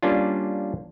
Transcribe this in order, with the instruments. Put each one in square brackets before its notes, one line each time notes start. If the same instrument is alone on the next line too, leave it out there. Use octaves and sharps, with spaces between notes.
[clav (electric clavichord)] G3 A#3 C#4 D4 F4